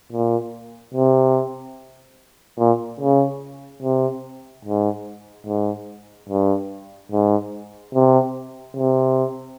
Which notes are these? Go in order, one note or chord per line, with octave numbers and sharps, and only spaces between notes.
A#2
C3
A#2
C#3
C3
G#2
G#2
G2
G#2
C3
C3